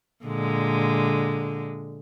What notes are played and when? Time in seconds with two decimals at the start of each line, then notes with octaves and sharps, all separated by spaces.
0.24 A#2 D3 G#3